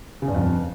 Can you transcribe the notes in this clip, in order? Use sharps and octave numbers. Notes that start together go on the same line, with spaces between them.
C#3
G2
F2